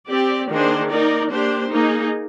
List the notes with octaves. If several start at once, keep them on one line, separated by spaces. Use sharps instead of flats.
C4 G4 D5
D#3 A#3 D4 G#4 C5
A#3 D#4 A#4 D5
A#3 D4 G4 C5
A#3 D#4 G#4